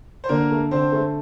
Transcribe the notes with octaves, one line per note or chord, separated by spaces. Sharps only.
C5
D3 A#3 A#4
A3
D3 C4 C5
A3